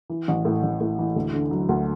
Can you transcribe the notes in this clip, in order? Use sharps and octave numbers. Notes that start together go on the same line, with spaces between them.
E3
A1
A2
A1
A2
E3
D2
D3
F#3
D2